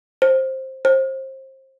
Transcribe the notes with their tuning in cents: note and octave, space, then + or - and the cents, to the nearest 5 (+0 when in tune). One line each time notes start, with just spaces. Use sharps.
C5 +15
C5 +30